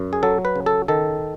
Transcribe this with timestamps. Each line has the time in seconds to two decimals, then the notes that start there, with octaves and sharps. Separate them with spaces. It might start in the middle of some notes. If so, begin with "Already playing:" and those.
Already playing: F#2
0.13 G#4
0.23 F#3 A4
0.45 B4
0.56 C#3
0.66 A4
0.88 D#3 A4